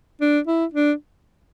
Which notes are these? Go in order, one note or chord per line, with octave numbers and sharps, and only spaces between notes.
D4
E4
D4